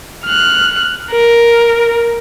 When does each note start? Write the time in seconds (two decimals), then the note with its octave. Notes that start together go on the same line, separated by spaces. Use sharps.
0.25 F6 F#6
1.12 A#4